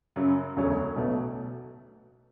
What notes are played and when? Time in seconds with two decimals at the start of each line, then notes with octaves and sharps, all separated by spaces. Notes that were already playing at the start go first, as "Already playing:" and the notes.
0.16 F#2 C#3 F#3
0.56 E1 D2 C#3 F#3 C#4
0.96 B1 B2 A3